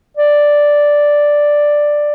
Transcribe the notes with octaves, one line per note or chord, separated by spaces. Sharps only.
D5